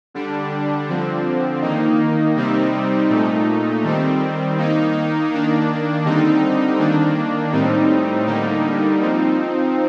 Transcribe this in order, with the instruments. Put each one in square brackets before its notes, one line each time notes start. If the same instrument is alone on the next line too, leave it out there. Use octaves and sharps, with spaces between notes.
[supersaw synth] D3 G3 D4
D3 F3 C4
D#3 A#3 D#4
C3 G3 C4 D#4
A#2 A3 D#4
D#3 G3 C4
D#3 A#3 D#4
D#3 A#3 D4
D3 G3 C4 D#4
D#3 A#3 D4
A2 G3 C4 D#4
D3 G3 A#3 D#4
F3 C4 D#4